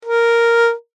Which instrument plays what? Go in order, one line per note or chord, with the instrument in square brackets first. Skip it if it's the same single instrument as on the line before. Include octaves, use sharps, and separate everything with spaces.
[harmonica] A#4